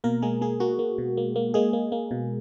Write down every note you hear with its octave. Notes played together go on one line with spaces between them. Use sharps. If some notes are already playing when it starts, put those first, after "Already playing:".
B2 A#3 A#4
G#3 A#3 G#4
G#3 A#3 G#4
A#3 F#4
A#3
B2
A#3
A#3
G#3 A#3 G#4
A#3
A#3
B2